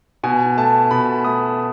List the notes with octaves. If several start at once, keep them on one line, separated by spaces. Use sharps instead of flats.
B2 G#5
A3 A5
B2 B5
A3 D#6